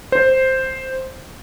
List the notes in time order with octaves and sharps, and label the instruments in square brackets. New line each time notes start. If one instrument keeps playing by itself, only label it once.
[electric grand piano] C5